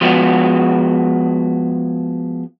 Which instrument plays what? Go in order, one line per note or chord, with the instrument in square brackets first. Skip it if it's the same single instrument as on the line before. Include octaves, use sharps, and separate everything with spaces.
[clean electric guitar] F3 G#3 B3 F4 F#4 G#4